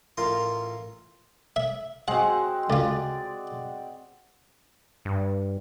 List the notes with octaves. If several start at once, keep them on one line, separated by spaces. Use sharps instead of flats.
A1 F4 A#4 C6
E5
G#3 C4 F#4 F#5
C#2 F4 D5
G2